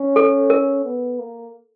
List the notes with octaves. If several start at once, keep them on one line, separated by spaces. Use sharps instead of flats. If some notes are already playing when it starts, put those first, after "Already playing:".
Already playing: C#4
A4
A#4
B3
A#3